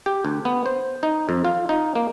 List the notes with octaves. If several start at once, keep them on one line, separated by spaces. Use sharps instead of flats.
G4
D2
B3
C5
D#4
F2
F4
D#4
A#3